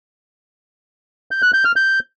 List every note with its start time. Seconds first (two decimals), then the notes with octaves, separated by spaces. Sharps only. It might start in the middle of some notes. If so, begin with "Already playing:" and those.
1.31 G6
1.42 F#6
1.54 G6
1.65 F6
1.76 G6